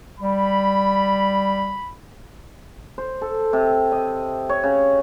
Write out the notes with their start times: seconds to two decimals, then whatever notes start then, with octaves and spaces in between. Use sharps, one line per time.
0.20 G3 B5
2.98 C5
3.22 A4
3.53 C3
3.92 D#5
4.49 C#5
4.64 C#3